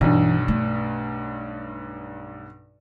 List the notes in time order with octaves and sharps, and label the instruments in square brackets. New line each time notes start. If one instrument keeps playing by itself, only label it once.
[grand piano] B1 G2 [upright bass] E3
[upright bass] A3